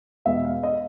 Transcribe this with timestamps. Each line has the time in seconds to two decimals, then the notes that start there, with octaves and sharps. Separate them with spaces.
0.25 E2 B2 G#3 B3 E5
0.45 F5
0.63 D#5